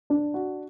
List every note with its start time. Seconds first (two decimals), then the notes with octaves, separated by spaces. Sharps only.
0.10 D4
0.34 F#4